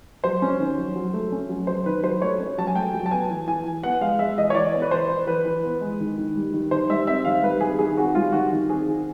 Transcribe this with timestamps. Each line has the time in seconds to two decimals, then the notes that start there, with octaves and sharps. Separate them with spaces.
0.24 F#3 C5
0.42 C#4
0.60 D#3
0.78 F#3
0.96 F#3
1.14 A3
1.32 C#4
1.49 F#3
1.67 F#3 C5
1.86 D#3 B4
2.03 F#3 C5
2.22 A3 C#5
2.40 C#4
2.58 F#3 A5
2.67 G#5
2.75 A3 G5
2.94 F#3
3.06 A5
3.11 B3 G#5
3.30 E3
3.48 E3 G#5
3.66 E3
3.83 B3 F#5
4.01 G#3 F5
4.19 G#3 E5
4.38 E3 D#5
4.50 C#5
4.55 E3 D5
4.74 B3
4.82 B4
4.91 E3 C5
5.09 E3
5.27 E3 B4
5.45 E3
5.64 B3
5.81 G#3
6.00 D#3
6.18 D#3
6.36 G3
6.53 D#3
6.71 D#3 C5
6.89 G3 E5
7.07 C4 E5
7.25 D#3 F5
7.43 G3 B4
7.61 D#3 G#4
7.79 D#3 G#4
7.97 C4 F#4
8.15 G3 F4
8.32 D#3 F#4
8.52 D#3
8.69 C4 G#4
8.88 D#3